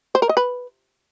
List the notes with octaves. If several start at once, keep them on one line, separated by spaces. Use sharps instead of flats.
C5
A#4
D#5
B4